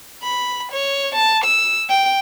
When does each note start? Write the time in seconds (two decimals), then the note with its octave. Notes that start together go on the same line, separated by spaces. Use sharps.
0.23 B5
0.72 C#5
1.15 A5
1.45 E6
1.89 G5